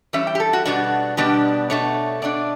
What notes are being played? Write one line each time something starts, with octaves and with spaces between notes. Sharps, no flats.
E3 G3 C#4 E5
G5
G4
A4
F#4
B2 G3 B3 D4 F#4
B2 G3 B3 D4 G4
B2 A3 D4 C#5
B2 A3 D4 D5